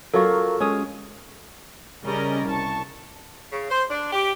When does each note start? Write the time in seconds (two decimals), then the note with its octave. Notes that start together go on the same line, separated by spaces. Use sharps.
0.14 F#3 F4 F#4 A4 A#4 F5 C#6
0.60 G#3 C#4 G#4 D#6
2.05 C#3 G3 C#4 A#4 D5 D#5
2.44 C2 A5 C#6
3.51 C#3
3.68 C5
3.89 D4
4.12 G4